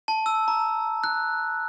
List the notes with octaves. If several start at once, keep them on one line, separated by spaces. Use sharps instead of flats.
A5
E6
A#5
F#6